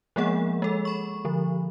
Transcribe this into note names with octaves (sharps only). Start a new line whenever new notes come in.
F3 G#3 A#3 B3 G#4 F#5
G#3 A4
B5 C#6
D3 F3